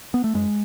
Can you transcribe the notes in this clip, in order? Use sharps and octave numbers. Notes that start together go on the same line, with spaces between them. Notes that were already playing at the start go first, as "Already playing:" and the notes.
B3
A3
F#2 G#3